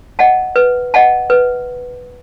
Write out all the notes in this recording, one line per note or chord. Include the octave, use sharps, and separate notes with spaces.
D#5 F#5 A5
B4
D#5 F#5 A5
B4